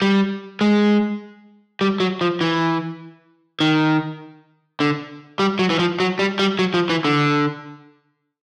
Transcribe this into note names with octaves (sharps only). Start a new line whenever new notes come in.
G3
G#3
G3
F#3
F3
E3
D#3
D3
G3
F#3
E3
F3
F#3
G3
G3
F#3
F3
E3
D3